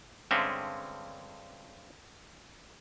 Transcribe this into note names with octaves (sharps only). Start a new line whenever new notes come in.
G2 D3 G#3 C4 C#4 E5